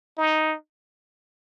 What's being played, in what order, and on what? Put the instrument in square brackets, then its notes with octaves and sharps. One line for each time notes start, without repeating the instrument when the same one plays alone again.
[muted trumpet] D#4